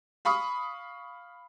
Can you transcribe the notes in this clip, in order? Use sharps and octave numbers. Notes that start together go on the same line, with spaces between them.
F5 B5 C#6 D#6